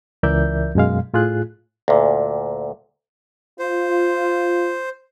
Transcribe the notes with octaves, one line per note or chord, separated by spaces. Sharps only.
C#2 E3 A#4 D5 E5 G6
F#2 B2 G#3 F5
A2 F4 G#4 F#6
D2 A#2
F4 C5